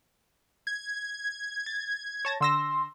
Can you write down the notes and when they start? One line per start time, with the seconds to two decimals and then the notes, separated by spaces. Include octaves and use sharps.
0.67 G#6
1.66 A6
2.25 C#5 A5 A#6
2.41 D3 C6 E6 A#6